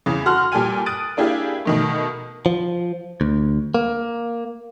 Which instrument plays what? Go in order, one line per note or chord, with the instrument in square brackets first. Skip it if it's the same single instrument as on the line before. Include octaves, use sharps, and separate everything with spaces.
[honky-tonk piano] E2 C#3
F#4 A4 C6 F6
A#2 G3 A4 G5 G#5 D#7
D#6 F#6 A6 D7 D#7
A#3 D4 E4 G4 G#4 F5
B2 D#3 A3
[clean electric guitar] F3
D2
A#3